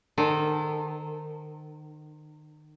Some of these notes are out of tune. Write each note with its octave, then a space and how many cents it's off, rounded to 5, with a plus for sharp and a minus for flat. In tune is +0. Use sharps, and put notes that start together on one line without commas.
D#3 -35 A4 -20 C5 -25